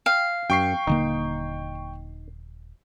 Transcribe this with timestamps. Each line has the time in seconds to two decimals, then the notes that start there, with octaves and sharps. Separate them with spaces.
0.06 F5 G5
0.50 F#2 G5 C#6 C7
0.87 D#1 D3 A#3 D#4